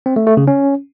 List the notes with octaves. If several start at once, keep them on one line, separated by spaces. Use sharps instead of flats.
C4
A3
A3
C#3
C#4